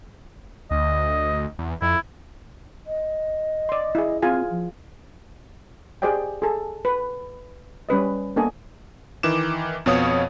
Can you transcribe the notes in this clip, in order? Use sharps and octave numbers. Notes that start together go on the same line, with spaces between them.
D2 D#5
E2
F2 E4
D#5
D5 C6
E4 G#4
C4 F4 G#4 G#5
F3
G4 G#4 C5 D5 D#5 G5
G#4 A4
B4
G3 C#4 B4 D#5
A#3 B3 D4 A4 D#5 G#5
D#3 E3 D6 E7
F2 B2 B3 C#5 F5 D#6